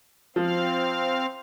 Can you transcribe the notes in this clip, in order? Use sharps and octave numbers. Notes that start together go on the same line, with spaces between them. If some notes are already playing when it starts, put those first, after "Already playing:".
F3 C4 F5